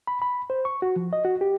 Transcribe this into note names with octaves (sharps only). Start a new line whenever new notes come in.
B5
B5
C5
C#6
F#4
F3
D#5
F#4
G4